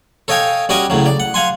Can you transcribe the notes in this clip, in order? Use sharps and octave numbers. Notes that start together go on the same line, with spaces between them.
A4 C#5 D#5 F5 G5 G#5
G3 C#4 F#4 D#5 G#5 D6
A2 C#3 F#3
D5
F#5
F5 F#5 G#5 C6